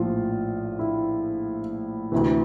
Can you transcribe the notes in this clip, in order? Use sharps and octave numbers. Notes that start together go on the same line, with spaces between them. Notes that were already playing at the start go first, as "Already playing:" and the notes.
Already playing: A#1 A2 F3 F4
E4
D2 C3 E3